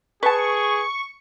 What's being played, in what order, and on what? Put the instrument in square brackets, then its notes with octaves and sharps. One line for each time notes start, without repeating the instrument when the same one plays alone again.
[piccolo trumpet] G#4 [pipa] B4 A5 [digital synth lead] C#6